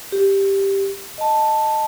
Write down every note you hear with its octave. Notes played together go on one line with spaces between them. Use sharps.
G4
D#5 A5